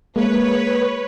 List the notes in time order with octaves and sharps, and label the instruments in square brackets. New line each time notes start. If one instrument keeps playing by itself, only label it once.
[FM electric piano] G#3 A#3 [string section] B4 C#5